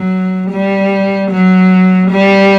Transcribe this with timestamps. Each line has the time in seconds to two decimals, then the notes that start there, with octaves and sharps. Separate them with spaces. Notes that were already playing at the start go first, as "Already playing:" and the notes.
Already playing: F#3
0.51 G3
1.31 F#3
2.11 G3